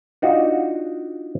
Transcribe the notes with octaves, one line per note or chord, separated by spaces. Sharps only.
D4 D#4 F4 F#4